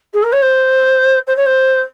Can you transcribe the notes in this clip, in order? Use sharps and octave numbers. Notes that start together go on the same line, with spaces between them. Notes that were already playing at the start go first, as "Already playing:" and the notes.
G#4
A#4
C#5
C5
C5
C#5
C5